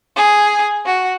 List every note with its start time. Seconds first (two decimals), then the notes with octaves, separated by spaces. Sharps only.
0.15 G#4
0.85 F#4